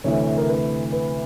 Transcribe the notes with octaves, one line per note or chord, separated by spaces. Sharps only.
D2 C3 E3 A3 C#5
A#4
B4
B4